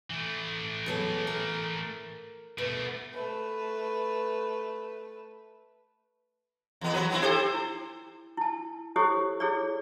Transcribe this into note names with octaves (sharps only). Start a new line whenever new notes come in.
E3 A3
E2 F#3 A4
A#4
B2 A3 B3
A3 B4
E2 B3
F#3 B4
B3 C4 E4
G4 A4 C5
E4
E4 A5
E4 G4 A4 C5 C#5
E4 G#4 A4 C#5 D5